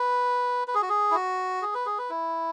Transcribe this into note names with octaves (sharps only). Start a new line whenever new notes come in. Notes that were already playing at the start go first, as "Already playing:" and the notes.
Already playing: B4
B4
G#4
F#4
G#4
E4
F#4
G#4
B4
G#4
B4
E4